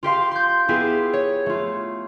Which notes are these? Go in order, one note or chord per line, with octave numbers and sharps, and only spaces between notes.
F4 G4 F5 C6
C6 G6
B3 E4 F4 G4 G#4
C#5
A3 F4